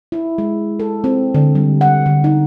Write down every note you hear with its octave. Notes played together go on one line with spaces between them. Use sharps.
E4
G#3
A4
C4
D3
G3
F#5
D3
D#4